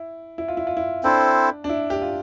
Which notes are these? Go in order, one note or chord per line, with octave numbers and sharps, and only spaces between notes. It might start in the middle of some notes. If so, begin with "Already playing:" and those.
Already playing: E4
E4
F4
E4
F4
E4
C4 D4 E4 A4 C5
D4
E4
G4
F4